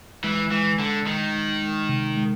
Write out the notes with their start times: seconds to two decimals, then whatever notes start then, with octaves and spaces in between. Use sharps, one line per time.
0.24 E3 G#3
0.52 E3 G#3
0.79 D3 G#3
1.07 D#3 G#3
1.35 G#3
1.62 G#3
1.89 C3
2.17 G#3